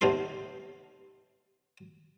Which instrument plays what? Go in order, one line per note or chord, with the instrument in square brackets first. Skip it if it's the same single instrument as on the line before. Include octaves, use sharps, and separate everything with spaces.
[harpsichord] D#2 C3 B3 D#4 A4 C6